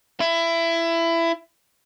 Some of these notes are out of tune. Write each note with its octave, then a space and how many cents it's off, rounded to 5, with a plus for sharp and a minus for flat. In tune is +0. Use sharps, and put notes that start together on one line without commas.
E4 +20